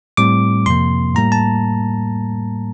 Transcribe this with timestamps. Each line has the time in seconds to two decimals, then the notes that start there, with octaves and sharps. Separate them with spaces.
0.17 A2 G3 C4 D6
0.66 F2 C3 F3 A#3 C6
1.15 A2 G3 A#3 A#5
1.32 A5